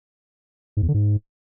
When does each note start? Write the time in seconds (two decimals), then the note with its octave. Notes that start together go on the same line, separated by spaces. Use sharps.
0.77 G#2
0.83 E2
0.88 D3
0.94 G#2